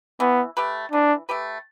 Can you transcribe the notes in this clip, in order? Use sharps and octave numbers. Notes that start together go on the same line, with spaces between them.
E3 B3
A3 G4 B4
E3 D4
A3 G4 B4